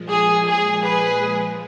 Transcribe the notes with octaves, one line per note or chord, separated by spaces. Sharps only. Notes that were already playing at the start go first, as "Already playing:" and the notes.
Already playing: A#2 F3 G#3
G#4
G#4
G#4 B4